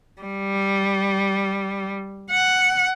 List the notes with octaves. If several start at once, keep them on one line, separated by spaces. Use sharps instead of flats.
G3
F#5